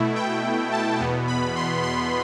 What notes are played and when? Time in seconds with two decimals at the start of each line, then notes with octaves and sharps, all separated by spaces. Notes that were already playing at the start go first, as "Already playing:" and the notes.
Already playing: B2 A3 E4
0.15 G5
0.72 A5
0.99 E2 B2 B3
1.27 B5
1.56 C6
1.83 C6